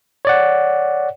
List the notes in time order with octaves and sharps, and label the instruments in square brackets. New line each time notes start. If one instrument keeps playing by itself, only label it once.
[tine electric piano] C#5 D5 F#5